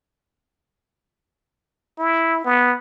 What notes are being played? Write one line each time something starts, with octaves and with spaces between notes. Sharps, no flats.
E4
B3